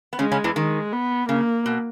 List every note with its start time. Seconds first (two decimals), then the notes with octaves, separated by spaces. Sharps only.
0.13 B3
0.19 C#3 G#3 C#4
0.32 C#3 C#4
0.44 E2 E3
0.56 D#3 G#3
0.93 B3
1.29 C#3 A#3
1.66 B2